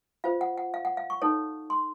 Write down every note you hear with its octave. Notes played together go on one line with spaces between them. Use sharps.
F4 C5 F5
F#5
F#5
F5
F#5
F5
C#6
D#4 A4 C#5
C6